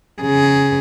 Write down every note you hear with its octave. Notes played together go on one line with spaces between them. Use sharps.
C#3 G#4